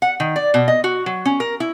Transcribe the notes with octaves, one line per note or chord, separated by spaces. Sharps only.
F#5
D#3
D5
B2
D#5
F#4
F#3
C#4
A#4
E4